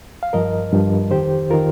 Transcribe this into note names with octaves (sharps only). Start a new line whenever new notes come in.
F5
G2 F3 A#4 D#5
G2 F3
F2 D#3 G4 C5
D#3 F4 A#4